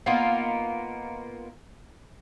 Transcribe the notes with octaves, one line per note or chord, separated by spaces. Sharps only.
A#3 B3 D#4 F4